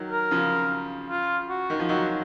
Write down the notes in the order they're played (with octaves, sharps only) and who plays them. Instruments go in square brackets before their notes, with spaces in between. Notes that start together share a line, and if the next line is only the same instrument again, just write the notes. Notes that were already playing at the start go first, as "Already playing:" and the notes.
Already playing: [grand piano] D#3 F#3
[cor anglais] A#4
[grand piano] C#3 F3
[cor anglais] F4
F#4
[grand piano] D#3
F3
[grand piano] D#3 F#3 [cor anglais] F#4